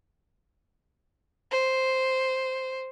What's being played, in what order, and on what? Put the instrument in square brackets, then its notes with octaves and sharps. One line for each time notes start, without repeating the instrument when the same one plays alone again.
[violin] C5